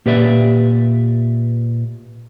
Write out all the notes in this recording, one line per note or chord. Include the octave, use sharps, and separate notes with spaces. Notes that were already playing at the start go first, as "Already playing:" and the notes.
A#2 G4 B4 D5 E5